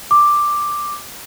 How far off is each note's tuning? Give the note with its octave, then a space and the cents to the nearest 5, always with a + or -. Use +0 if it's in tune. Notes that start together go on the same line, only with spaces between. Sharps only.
D6 +5